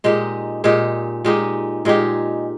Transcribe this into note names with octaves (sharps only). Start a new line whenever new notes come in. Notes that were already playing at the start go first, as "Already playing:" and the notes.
A#2 G#3 D#4 G4
A#2 G#3 D#4 G4
A#2 G#3 D#4 G4
A#2 G#3 D#4 G4